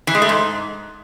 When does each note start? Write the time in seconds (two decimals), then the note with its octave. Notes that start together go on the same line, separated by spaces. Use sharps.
0.07 E3
0.15 G#3
0.22 A3
0.29 G#2